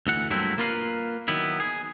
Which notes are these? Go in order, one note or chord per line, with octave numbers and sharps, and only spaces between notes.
D2 E3 F#5
G2 A#2 F#3 A3 C4 E4
A#3 F4 A#4 B4 F5
D#3 F#3 B3 E4
G#4